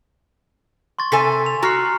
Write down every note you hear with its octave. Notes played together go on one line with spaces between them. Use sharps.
C6 C#6 A6
C3 A4 G#5 B6
F7
F#4 A#5 F6 C7